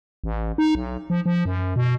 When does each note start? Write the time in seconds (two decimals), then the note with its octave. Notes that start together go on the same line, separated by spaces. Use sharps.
0.24 A1
0.58 D#4
0.75 B1
1.10 F3
1.26 F3
1.45 F#2
1.76 B2